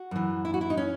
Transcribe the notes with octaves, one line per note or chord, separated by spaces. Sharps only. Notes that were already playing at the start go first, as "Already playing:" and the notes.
Already playing: F#4
F#2 E3
E4
F#4
E4
D#4
C#4